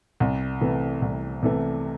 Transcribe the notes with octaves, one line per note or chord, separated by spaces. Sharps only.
C2
C3 E3 A3
C2
C3 E3 A3